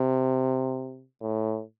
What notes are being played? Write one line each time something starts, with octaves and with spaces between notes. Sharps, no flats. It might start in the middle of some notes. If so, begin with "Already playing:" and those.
Already playing: C3
A2